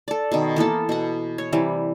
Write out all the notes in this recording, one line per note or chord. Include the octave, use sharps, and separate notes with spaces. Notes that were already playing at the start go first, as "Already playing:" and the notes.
A4 D5
B2 D#3
E3 A#3 B3 A4
B2 F#5
C#5
C3 E3 G3